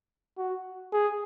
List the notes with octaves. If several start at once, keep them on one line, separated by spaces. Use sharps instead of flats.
F#4
G#4